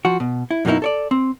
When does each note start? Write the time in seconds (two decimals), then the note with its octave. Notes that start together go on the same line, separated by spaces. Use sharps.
0.05 F3 F#4
0.20 B2
0.51 E4
0.65 F#2 B2 F#3 A#3 D#4 E4
0.82 A4 C#5 D5
1.11 C4